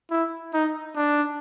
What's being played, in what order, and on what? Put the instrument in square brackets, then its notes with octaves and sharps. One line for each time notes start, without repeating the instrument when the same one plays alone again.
[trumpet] E4
D#4
D4